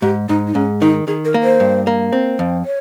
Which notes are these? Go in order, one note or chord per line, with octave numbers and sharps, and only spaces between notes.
G#2 G4
G#2 D#4
D#4
G#2 C#4
D#3 D#4
D#3 G#4
A#4
A#3
C5
G2
A#3
C4
F2
C#5